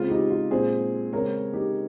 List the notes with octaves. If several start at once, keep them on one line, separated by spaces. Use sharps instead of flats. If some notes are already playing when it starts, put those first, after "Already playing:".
Already playing: C#3 G#3 C4 F4
D#4 G4
F4
A#2 G#3 C4 G#4 C5
C#3 G#3 C4 A#4 C#5
D#4 G4